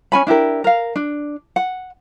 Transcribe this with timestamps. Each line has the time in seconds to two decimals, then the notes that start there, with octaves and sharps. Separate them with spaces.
0.12 C#4 G#5 B5
0.27 D4 E4 G4 A#4
0.64 A#4 F5
0.96 D4
1.56 F#5